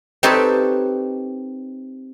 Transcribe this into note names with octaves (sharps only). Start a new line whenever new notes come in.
C4 D#4 G4 A4 B4 C#5